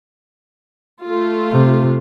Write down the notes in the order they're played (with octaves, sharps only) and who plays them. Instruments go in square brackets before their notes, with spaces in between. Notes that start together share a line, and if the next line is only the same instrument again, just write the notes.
[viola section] A3 F4
[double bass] C3